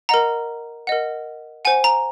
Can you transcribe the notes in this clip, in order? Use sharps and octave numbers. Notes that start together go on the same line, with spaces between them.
A#4 D#5 F#5 A#5
A#4 D#5 F#5
C5 F#5 G#5
A#5